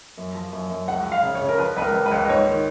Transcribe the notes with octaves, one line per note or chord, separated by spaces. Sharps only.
F#2
F3
F#2
F#2
C#2 F#5
F3
F5
C#3
C#5
C#3
A#4
F3 B4
C#2 B4
A#4
C#2
B4
C#2
D#5
G#2 C#5
D#3